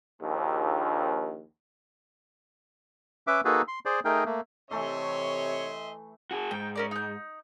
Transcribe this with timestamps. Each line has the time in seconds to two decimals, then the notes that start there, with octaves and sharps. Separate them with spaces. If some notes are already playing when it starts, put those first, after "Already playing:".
0.22 A#1 D#2
3.27 C#4 B4 E5 D6
3.45 A#3 D#4 F#4 G#4 A4 B4
3.68 C6
3.85 G#4 C5 D5
4.05 A3 D#4 G#4 A#4 G5
4.26 A3 A#3
4.71 C3 E3 A3 C#5 D#5 E5 C6
6.31 F#4 G#4
6.51 G#2 G5
6.75 C#4 A#4 D5
6.91 D#4 G6